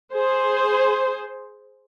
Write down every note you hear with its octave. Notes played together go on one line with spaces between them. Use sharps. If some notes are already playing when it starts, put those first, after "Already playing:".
G#4 C5